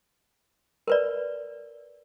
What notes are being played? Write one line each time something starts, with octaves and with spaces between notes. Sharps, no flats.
A#4 B4 D5